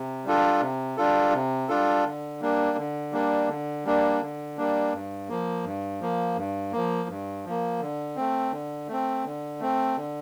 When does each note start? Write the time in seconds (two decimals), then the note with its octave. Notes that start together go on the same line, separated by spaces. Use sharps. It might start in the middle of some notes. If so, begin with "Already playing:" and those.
Already playing: C3
0.25 G3 D4 F4 A4
0.61 C3
0.97 G3 D4 F4 A4
1.33 C3
1.69 G3 D4 F4 A4
2.05 D3
2.41 G3 A#3 D4
2.78 D3
3.12 G3 A#3 D4
3.48 D3
3.85 G3 A#3 D4
4.21 D3
4.57 G3 A#3 D4
4.93 G2
5.29 F3 A#3
5.64 G2
6.01 F3 A#3
6.37 G2
6.72 F3 A#3
7.09 G2
7.45 F3 A#3
7.81 D3
8.16 A3 C4
8.52 D3
8.88 A3 C4
9.25 D3
9.60 A3 C4
9.96 D3